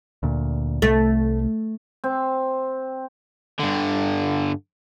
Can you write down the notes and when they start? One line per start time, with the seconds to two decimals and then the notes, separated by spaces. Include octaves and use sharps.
0.23 D2 A#2
0.82 C2 A3
2.04 C4
3.59 G2 D3